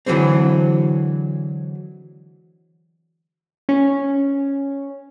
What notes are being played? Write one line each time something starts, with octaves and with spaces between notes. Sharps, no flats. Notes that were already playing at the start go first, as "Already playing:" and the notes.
D3 E3 F#3 G#3 C4
C#4